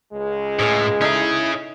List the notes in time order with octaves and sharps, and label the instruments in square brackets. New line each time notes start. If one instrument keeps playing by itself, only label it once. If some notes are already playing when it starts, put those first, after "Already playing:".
[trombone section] C#2 G#3
[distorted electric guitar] A2 [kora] G#4 C#5 F5
[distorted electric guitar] C#4 G#4 [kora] D#4 A4 [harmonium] E4